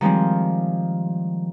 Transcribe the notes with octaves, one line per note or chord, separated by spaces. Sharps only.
D#3 F3 G3 G#3 C4